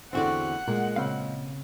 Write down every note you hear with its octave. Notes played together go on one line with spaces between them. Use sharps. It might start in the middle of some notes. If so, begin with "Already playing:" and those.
E2 D3 C4 F#4 D5 F#5
A#2 G#3
C#3 C4 F5